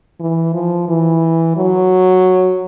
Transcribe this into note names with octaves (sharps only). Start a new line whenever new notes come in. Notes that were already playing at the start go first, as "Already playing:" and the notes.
E3
F3
E3
F#3